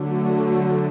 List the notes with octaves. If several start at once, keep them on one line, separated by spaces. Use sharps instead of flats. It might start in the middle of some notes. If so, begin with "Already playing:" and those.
Already playing: D3 F#3 A3